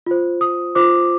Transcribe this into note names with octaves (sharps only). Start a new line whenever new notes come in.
F4 C5
D#6
F4 C5 D6